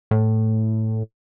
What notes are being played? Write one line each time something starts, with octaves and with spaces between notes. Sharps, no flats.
A2